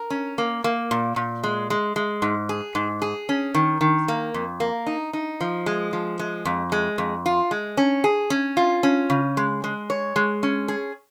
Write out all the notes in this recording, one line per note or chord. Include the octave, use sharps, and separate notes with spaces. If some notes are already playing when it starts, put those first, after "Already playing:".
Already playing: A#4
C#4
A#3
A#3
A#2
A#2
G#3
G#3
G#3
G#2
G#4
G#2
G#4
C#4
D#3
D#3
A#3
F2
A#3
D#4
D#4
F3
G#3
F3
G#3
F2
G#3
F2
F4
G#3
C#4
G#4
C#4
F4
C#4
C#3
G#3
G#3
C#5
G#3
C#4
G#4